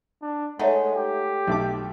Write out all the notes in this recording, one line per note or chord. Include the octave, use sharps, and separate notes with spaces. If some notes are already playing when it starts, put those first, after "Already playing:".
D4
G#3 A3 D#4 C#5 E5 F#5
G4
B1 A3 D6